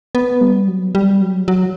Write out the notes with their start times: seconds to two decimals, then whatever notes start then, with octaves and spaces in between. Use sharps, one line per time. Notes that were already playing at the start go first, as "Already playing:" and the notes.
0.15 B3
0.41 G3
0.68 F#3
0.95 G3
1.22 F#3
1.48 F#3